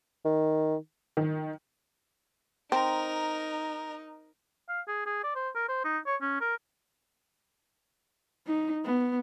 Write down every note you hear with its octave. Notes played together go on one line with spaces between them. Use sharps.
D#3
D#3
C4 D#4 A#4
F5
G#4
G#4
D5
C5
A#4
C5
D#4
C#5
C#4
A#4
D#4
B3